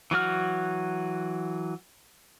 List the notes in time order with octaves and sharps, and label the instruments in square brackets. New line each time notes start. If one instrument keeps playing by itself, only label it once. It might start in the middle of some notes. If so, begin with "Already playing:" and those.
[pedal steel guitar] E3 F#3 F#4 F6